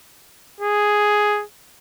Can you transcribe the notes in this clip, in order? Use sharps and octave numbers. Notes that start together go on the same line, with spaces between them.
G#4